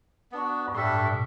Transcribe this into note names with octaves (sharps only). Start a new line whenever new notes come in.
B3 D4 F#4
G2
A2 G3 D4 A4 E5
G2
A2
B2